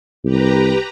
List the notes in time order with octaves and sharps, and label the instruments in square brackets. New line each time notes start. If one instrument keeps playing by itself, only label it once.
[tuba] C2 [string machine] G4 B4 A#5